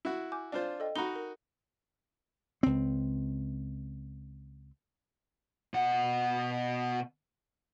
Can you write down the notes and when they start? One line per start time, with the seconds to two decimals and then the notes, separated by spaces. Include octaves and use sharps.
0.05 E4 F#4
0.32 G#5 D6 G6
0.52 D4 F4 C5
0.80 A4 D#5 G5
0.96 D#4 F#4 A#5 B5 G7
1.16 A#4
2.63 C#2 C4
5.74 B2 F#5